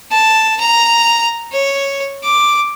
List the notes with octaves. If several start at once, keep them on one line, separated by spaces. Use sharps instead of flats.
A5
A#5
C#5
D6